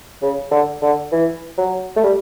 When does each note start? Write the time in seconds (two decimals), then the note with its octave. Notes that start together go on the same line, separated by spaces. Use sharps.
0.22 C#3
0.51 D3
0.82 D3
1.12 E3
1.58 F#3
1.97 A3
2.03 G3